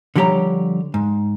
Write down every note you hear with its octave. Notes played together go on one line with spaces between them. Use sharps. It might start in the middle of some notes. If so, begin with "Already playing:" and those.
D3 F3 G3 G4 C#5 A#5
G#2